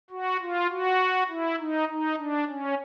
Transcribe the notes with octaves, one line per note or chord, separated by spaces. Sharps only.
F#4
F4
F#4
E4
D#4
D#4
D4
C#4